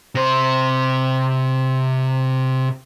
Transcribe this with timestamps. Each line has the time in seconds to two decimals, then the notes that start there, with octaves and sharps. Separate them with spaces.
0.15 C3 C5